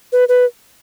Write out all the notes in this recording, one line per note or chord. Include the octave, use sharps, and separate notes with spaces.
B4
B4